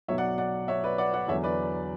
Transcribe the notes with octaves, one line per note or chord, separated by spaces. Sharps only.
B1 B2 F#3 C#5 E5
D5 F#5
D5 F#5
C#5 E5
B4 D5
D5 F#5
D5 F#5
E2 D3 F#3 C#5 E5
B4 D5